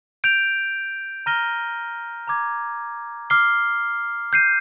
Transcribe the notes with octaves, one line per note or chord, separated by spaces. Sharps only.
G6 D7 F7
A#5 F6 A#6 D#7 G7
A#5 D6 G#6
D6 F6 C7 G7
G6 C7 D#7